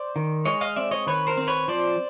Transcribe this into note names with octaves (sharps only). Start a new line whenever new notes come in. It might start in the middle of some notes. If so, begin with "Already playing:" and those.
Already playing: C5 D5
D#3
G#3 C#5 D#5
D#5 F5
C4 D5 E5
C#5 D#5
D#3 B4 C#5
A#4 C5
C4
B4 C#5
F3 C5 D5